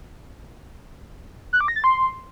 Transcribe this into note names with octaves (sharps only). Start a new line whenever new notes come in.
F#6
D6
A#6
A6
C6